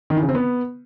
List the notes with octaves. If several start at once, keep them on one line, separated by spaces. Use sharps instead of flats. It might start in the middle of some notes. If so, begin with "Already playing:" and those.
D#3
E3
C#3
C4
B3